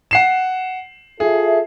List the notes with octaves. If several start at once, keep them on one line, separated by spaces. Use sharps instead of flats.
F#5 C7 E7
F4 G#4 A4 E5